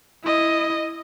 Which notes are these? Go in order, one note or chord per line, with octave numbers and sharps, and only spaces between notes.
E4 D#5